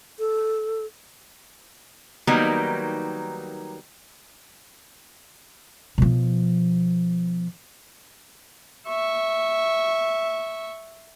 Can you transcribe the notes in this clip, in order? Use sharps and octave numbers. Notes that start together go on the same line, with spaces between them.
A4
D#3 F#3 G3 A#3 B3 D#4
B2 F3
E5 C#6